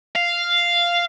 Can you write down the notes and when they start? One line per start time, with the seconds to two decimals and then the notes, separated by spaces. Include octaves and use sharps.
0.15 F5